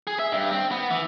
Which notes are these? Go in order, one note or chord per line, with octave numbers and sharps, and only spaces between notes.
G#4
E5
G2
C4
B3
E3